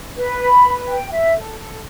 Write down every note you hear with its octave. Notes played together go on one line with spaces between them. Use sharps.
B4
B5
B4
G5
E5
A4
A4